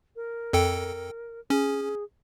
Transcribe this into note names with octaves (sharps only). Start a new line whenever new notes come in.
A#4
F2 A4 G5
C#4 G#4